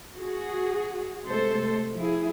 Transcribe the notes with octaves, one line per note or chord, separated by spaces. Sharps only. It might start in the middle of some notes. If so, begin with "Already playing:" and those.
F#4 G#4
C3 G#3 A3 A4 C5
F3 E4 G#4